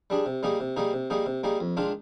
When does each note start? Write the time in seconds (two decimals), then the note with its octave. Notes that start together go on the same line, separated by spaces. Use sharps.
0.10 G3 D4 G#4
0.26 C3
0.43 G3 A#3 D#4 G#4
0.60 C3
0.76 G3 A#3 D#4 G#4
0.93 C3
1.10 G3 A#3 D#4 G#4
1.26 C3
1.43 G3 A#3 D#4 G#4
1.60 F2
1.77 D#3 G#3 D4 F4